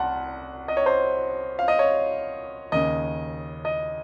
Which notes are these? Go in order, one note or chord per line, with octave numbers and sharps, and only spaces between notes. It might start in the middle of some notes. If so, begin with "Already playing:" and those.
Already playing: C2 F#5 A5 C6
D#5
C#5
C5
F5
D#5
C#5
D#2 C#3 D#5
D#5